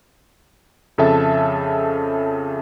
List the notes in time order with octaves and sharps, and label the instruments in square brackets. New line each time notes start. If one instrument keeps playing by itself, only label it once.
[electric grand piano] F2 C#3 A4 E5 A5